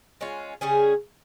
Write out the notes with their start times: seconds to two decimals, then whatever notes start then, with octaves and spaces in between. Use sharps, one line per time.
0.21 G#3 C#4 F4
0.61 C#3 G3 C#4 G#4